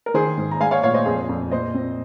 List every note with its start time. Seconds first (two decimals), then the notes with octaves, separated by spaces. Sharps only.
0.06 A#4
0.14 D#3 G#4 C5
0.37 G#2
0.51 A#5
0.60 G#3 F5 G#5
0.71 C#5 F5
0.83 A#2 C#5 F5
0.94 C5 D#5
1.06 F2 G#4 C5
1.29 F2
1.51 A#2 C5 D#5
1.74 C4